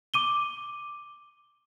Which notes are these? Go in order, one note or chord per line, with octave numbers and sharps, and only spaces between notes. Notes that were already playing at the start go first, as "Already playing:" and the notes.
D6 D#7 G7